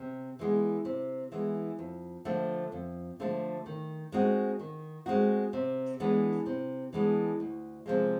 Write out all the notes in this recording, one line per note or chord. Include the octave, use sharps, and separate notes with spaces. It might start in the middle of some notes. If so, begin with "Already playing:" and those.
Already playing: C3
E3 G#3 B3
C3
E3 G#3 B3
F2
D3 F3 A3
F2
D3 F3 A3
D#3
G#3 C4 D#4 F#4
D#3
G#3 C4 D#4 F#4
C3
E3 G#3 B3 D4
C3
E3 G#3 B3 D4
D2
C3 F3 G#3